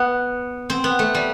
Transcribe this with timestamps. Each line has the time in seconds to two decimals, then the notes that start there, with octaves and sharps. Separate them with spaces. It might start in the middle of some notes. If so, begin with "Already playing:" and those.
Already playing: B3
0.70 C4
0.84 B3
0.99 A3
1.15 G3